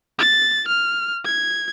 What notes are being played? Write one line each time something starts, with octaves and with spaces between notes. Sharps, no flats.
A6
F6
G#6